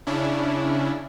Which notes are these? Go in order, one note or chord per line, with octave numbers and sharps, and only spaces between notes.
C#3 C#4 D4 E4